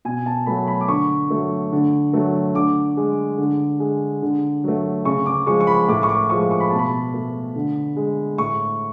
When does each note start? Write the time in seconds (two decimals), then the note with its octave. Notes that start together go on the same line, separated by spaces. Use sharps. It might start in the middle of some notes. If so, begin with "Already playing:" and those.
0.05 B2 G#5
0.26 A5
0.46 F#3 A3 B5
0.58 A5
0.67 B5
0.81 D6
0.88 D3 C#6
1.30 F#3 A3
1.72 D3
2.13 F#3 A3
2.55 D3 D6
2.97 G#3
3.38 D3
3.80 G#3
4.22 D3
4.64 F#3 A3
5.05 C#3 C#6
5.26 D6
5.47 F3 G#3 C#6
5.60 C#6
5.67 B5
5.88 A2 D6
6.03 C#6
6.09 D6
6.30 F3 G#3 C#6
6.51 C#6
6.60 B5
6.70 B2 A5
6.79 B5
7.14 A3
7.56 D3
7.96 G#3
8.38 A2 C#6